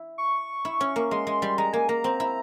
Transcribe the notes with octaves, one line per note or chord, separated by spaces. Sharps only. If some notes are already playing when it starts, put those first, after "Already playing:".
Already playing: E4
C#6
E4
C#4
A#3
G#3 C6
G#3
G3
G#3 A#5
A#3 G#5
A#3 A#5
C4
E4